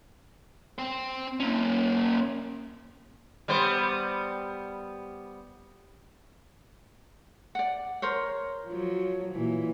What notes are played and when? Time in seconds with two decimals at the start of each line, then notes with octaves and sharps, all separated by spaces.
0.79 C4 C5
1.40 A#3 C#4
3.48 G3 B3 C5
7.55 D5 F#5
8.02 A#4 C5 C#5
8.66 F3 F#3
9.32 A#2 E3